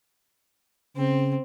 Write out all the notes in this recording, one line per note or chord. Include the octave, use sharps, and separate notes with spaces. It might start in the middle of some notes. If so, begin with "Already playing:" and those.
C#3 C4